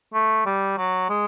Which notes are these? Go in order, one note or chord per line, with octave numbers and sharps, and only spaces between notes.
A3
G3
F#3
G#3